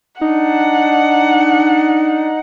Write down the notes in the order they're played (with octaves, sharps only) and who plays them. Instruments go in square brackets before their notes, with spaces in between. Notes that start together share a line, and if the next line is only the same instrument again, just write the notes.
[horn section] D4 [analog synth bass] D#4 [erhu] F#5